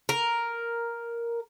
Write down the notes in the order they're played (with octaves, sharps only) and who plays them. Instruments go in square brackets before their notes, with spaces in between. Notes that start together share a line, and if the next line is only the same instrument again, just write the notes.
[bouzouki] A#4